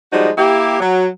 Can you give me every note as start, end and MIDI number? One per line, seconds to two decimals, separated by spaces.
0.12 0.28 53
0.12 0.28 55
0.12 0.28 56
0.12 0.28 63
0.12 0.28 66
0.38 0.76 58
0.38 0.76 64
0.38 0.76 67
0.80 1.06 54